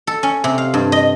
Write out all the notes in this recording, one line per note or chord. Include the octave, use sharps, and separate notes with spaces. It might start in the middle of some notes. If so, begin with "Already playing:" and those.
A4
C#4
C3
F5
G2
D#5